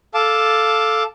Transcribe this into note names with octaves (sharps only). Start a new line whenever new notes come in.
A4 F5 A5 D6